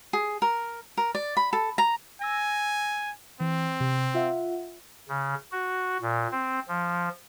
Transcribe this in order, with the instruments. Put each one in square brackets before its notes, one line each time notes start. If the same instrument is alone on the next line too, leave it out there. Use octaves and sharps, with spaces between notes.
[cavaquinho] G#4
A#4
A#4
D5
B5
A4
A#5
[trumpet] G#5 [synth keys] E6 A#6
[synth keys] E3 [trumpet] C4
[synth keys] C3
F4 E5 F#5
[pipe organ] C#3
F#4
A#2
C4
F3